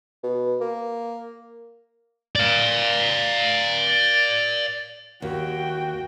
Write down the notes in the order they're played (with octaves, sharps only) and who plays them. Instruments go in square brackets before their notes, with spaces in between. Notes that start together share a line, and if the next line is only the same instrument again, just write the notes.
[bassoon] B2
A#3
[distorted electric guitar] D5 F5
[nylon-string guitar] D#2 [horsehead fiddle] F#4 G5